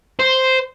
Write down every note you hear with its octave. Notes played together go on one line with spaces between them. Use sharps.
C5